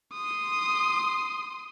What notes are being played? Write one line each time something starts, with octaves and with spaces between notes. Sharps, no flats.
C6 D#6